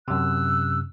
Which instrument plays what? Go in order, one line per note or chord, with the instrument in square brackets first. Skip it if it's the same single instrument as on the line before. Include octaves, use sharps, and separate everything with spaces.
[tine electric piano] F#2 C3 [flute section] E6 F#6